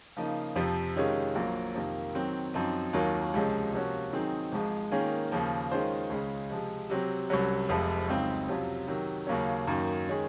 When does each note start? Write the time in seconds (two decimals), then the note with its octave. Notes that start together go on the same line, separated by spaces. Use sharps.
0.17 C#3 F3 A#3 D#4
0.56 F2 C3 F3
0.96 C3 D#3 G#3 C#4 F4
1.35 A#1 A#2 F#3 A#3
1.75 F2 C3 D#3 A#3
2.15 D#3 F#3 C4
2.54 F#2 F3 C4 D#4
2.93 D#2 D#3 F#3 A#3 F4
3.34 C#2 C3 F3 G#3 C#4
3.73 C3 F3 A#3 C#4 F#4
4.13 D#3 F#3 C4 D#4 G#4
4.52 G#1 G#2 F3 G#3
4.91 D#3 A#3 C#4 F4 G#4
5.32 D#2 C#3 F3 A#3
5.72 D#3 G#3 C#4 F4 C5
6.10 C#2 C#3 G#3
6.50 C3 F3 G#3
6.90 C3 F#3 C4
7.30 C2 C3 F#3 C#4
7.69 F1 F2 C3 F3 G#3
8.09 C#2 C#3 F#3 C4 D#4
8.48 F2 C3 F#3 C#4 F4
8.88 C3 D#3 F#3
9.27 D#2 C#3 F#3 A#3 C#4
9.67 F#2 D#3 A#3
10.08 D#3 G#3 C#4 G#4